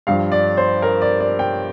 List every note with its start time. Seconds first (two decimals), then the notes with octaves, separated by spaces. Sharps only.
0.07 G2 F3 F5
0.32 D5
0.57 C5
0.82 A#4
1.02 D5
1.20 D5
1.39 G5